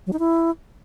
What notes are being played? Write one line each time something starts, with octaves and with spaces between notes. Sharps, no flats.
F#3
D#4
E4